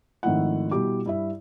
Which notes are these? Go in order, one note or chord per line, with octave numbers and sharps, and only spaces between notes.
G#1 D#3 F3 A3 E4 F#5
B2 G3 E4 G4 D6
G2 E4 E5